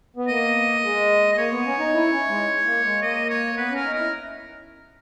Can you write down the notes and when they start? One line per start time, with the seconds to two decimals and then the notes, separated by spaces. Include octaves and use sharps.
0.16 B3
0.28 A#3 D#5
0.83 G#3
1.33 D#5
1.37 A#3 C#5
1.51 B3
1.66 C#4
1.79 D#4
1.93 E4
2.11 C#4
2.29 G#3
2.65 A#3
2.84 G#3
3.02 A#3 D#5
3.30 C#5
3.57 B3 B4
3.70 C#4 A#4
3.85 D#4
3.94 E4 A#4